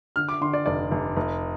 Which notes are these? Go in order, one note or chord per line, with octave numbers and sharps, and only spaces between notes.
D3 F6
D6
D3 C6
D5
F1 D5
F1
F1